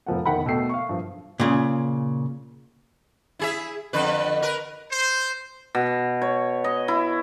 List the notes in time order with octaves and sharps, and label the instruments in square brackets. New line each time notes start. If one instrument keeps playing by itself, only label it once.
[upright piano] F1 F3 F#5
E1 D#3 F#5 G5 B5
B2 A3 A4 G5 C7
F5 C#6
G2 F3
[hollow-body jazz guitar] A#2 C#3 G#4
[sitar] E4 G#4 E5
F2 D3 B4
A#4 B4
[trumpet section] C5
[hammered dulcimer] B2
C#5
D#5
E4